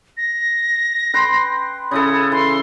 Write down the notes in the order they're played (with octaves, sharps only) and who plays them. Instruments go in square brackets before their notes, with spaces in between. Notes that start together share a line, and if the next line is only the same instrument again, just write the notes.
[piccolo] A#6
[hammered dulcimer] B4 G5 C6
[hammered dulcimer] C#3 E4 A4 [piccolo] D#6
[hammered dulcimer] E3 [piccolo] C6